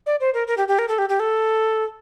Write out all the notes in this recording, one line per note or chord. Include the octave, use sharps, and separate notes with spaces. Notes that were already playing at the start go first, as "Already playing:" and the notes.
D5
C5
A#4
A#4
G4
G4
A#4
A4
G4
G4
A4